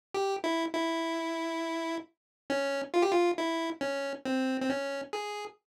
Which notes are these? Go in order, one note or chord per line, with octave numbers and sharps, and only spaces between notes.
G4
E4
E4
C#4
F4
G4
F4
E4
C#4
C4
C4
C#4
G#4